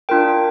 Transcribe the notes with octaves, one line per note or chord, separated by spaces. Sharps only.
D4 F4 A#4 G5